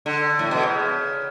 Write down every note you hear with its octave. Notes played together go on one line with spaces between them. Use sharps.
D3
A2
B2
C#3